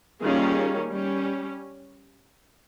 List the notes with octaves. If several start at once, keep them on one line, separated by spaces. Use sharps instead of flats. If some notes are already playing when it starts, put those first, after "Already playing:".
D#3 G3 A#3 C#4 F4 G#4
G3 C#4